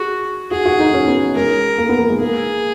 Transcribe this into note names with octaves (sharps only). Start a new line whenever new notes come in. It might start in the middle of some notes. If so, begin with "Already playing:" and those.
Already playing: F#4 G#4
F#4 G#4
F#4
D#4
C#4
B3
G#3 A#4
A#3
B3
A#3
G#3
A#3 G#4